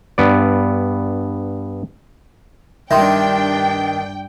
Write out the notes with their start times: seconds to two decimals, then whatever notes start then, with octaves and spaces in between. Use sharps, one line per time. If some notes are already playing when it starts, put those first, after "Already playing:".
0.18 G2 B3 D5
2.91 G2 D#3 D4 E5 G5 C6